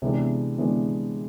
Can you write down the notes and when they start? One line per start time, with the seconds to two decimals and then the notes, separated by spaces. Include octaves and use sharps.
0.02 C3 E3 G#3 B3 D4
0.58 C3 E3 G#3 B3 D4